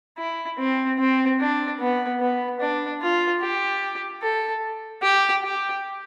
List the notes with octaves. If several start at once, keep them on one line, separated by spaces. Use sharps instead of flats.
E4
C4
C4
D4
B3
B3
D4
F4
G4
A4
G4
G4